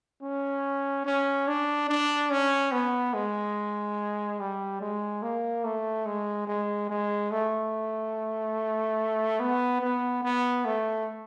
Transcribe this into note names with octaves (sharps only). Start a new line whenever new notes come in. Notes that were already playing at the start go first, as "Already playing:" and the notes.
C#4
C#4
D4
D4
C#4
B3
G#3
G3
G#3
A#3
A3
G#3
G#3
G#3
A3
B3
B3
B3
A3